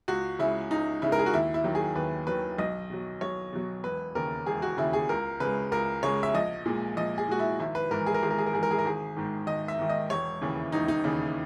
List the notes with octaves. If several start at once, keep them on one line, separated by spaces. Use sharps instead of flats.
C#2 F#4
C#3 G#3 E4
C#2 D#4
C#3 G#3 E4
A#4
G#4
F#4
D#2 E4
E4
D#3 F#3
G#4
D#2 B4
D#3 F#3 B4
B1 D#5
B2 F#3
B1 C#5
B2 F#3
E1 B4
D#2 C#3 A#4
E1 G#4
F#4
D#2 C#3 E4
G#4
C#2 A#4
C#3 G#3 B4
C#2 A#4
C#3 G#3 C#5
E5
A#1 D#5
A#2 G#3
A#1 D#5
G#4
A#2 G#3 F#4
E4
G#1 E4
B4
G#2 E3 A#4
G#4
A#4
G#1 G#4
A#4
G#4
A#4
G#2 E3 G#4
A#4
G#4
A#4
G#1 G#4
G#2 D#3
G#1 D#5
E5
G#2 D#3
D#5
E1 C#5
D#2 C#3 E3
E1 D#4
D#4
D#2 C#3 E3